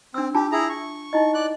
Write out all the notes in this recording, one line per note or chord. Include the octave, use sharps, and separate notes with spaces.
C4 D4 E6
D4 F4 G4 A5
E4 G#4 A#5
C#6
D#4 E4 D#5
D5 F#6